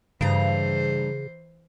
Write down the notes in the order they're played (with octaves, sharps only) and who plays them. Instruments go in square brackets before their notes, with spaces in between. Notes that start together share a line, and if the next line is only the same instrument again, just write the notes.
[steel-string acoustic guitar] G2 A#5 [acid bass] C#3 [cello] E3 C5